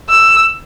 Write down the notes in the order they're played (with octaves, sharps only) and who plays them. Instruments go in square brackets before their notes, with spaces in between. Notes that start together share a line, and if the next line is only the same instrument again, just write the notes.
[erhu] E6